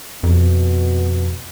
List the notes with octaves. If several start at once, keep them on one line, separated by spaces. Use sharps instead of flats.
F2 B2